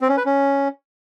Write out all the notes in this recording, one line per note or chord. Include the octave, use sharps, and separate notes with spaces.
C4
C#4
B4
C#4